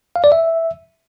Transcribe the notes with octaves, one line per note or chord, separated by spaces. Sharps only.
F5
D5
E5